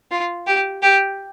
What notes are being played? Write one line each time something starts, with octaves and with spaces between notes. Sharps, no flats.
F4
G4
G4